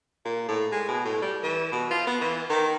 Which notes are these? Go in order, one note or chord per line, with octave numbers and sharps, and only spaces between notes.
A#2
A2
G#3
B2
A2
G3
E3
B2
F4
B3
E3
D#3